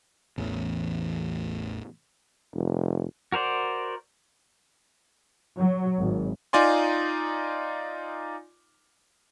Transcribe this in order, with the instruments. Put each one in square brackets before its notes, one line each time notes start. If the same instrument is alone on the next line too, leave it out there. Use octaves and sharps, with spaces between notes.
[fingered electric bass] A1 E2
[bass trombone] F1
[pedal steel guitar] F#4 A#4 C5 D5
[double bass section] F#3
G#1
[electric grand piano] D#4 F4 D5 G#5 C6